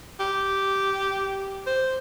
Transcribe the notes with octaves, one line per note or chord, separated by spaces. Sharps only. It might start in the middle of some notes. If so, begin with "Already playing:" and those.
G4
C5